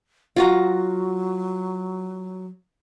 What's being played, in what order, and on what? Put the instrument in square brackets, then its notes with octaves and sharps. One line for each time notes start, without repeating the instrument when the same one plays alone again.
[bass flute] F#3 [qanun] F4 F#4 A#5